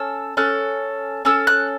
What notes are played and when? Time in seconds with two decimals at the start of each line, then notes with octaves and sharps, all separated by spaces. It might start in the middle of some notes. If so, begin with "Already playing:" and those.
Already playing: C#4 A4 E6
0.37 C#4 A4 F#6
1.25 C#4 A4 E6
1.47 F#6